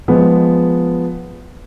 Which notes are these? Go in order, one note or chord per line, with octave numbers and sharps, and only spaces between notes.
F3 G#3 B3